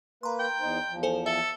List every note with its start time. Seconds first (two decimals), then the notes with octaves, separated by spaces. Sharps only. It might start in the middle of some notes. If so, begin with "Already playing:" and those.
0.23 A#3 B4 A#5 C6
0.39 G5
0.61 E2 D#4 C5
0.90 E2 F3
1.03 A4 C5 G#5
1.26 A4 E5